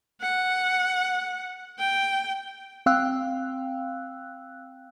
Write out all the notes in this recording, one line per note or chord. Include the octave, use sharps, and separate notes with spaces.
F#5
G5
C4 F5 G5 E6 F#6